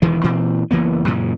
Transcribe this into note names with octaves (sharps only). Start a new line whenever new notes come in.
E1 D#3 E3 G#3
A#2 E3 C4
F#1 E3 A#3 B3
F#2 A#2 C#3 E3